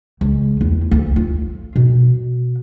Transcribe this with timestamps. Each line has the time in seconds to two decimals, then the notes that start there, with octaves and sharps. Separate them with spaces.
0.21 C#2
0.61 E2
0.91 D2
1.16 F4
1.76 B2